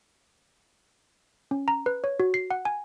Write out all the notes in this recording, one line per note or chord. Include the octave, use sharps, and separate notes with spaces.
C#4
A#5
B4
C#5
F#4
C7
F#5
G#5